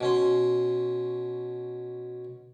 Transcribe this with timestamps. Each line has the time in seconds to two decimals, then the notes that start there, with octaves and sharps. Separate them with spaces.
0.01 B2 C#4 C6